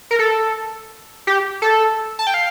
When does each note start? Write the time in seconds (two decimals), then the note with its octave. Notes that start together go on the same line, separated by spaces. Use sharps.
0.11 A#4
0.19 A4
1.27 G4
1.62 A4
2.19 A5
2.27 G5
2.34 F5